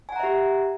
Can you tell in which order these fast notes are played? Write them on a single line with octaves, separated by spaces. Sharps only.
G#5 F#5 A#5 E5 G4